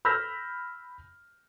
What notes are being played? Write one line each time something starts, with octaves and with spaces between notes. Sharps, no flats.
B5 E6 F6 G6 A#6 B6